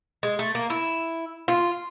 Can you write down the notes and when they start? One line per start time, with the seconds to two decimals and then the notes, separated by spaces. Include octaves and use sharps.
0.23 G#3
0.39 A3
0.55 A#3
0.70 E4
1.48 F4